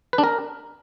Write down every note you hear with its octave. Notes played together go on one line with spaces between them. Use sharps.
B4
D4
A#4